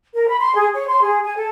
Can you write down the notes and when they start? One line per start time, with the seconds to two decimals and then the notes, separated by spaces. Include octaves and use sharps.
0.14 A#4
0.28 B5
0.40 C6
0.55 G#4
0.74 C#5
0.88 C6
1.02 G#4
1.25 G#5
1.36 A4